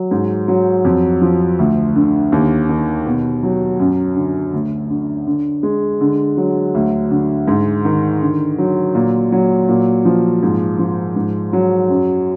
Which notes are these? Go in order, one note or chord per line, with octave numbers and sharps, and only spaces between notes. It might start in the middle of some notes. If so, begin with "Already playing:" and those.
Already playing: F#3
G#2
F#3
F2
F3
D2
D3
D#2
D#3
B2
F#3
F#2
D3
D2
D3
D3
G#3
D3
F#3
D2
D3
G#2
D#3
D3
F#3
A#2
F#3
A#2
F3
G#2
F3
G#2
F#3
F#2